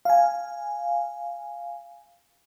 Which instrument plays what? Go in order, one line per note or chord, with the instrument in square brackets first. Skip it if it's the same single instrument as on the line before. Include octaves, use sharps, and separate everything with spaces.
[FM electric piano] F5 G#5